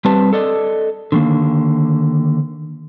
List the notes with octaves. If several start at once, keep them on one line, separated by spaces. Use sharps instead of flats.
G3 C4 G4 B4 A5
A4 D5 D#5
D3 D#3 A#3